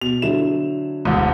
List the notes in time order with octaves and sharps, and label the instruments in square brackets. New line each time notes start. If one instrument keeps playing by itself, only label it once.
[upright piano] B2 [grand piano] F7
[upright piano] D3 F#3 E4 [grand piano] E7
[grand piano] E1 D2